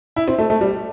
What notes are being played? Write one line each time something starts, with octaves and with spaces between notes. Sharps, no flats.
E4
C4
A3
A3
G3